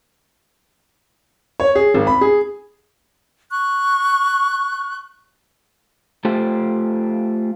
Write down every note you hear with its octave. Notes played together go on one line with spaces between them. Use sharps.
C#5
G#4
G#1
B5
G#4
C#6 F#6
A3 F4 G4 C5